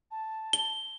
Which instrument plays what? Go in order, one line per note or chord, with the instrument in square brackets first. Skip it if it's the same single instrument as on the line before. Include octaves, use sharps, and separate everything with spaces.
[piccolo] A5
[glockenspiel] G7